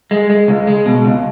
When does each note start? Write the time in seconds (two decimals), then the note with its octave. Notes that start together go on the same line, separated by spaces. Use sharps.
0.11 G#3
0.30 G#3
0.48 C#2
0.67 G#3
0.86 B2
1.05 C#2